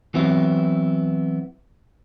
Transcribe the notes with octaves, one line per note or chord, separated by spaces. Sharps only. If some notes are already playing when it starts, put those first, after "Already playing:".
E3 F#3 B3 C4 E4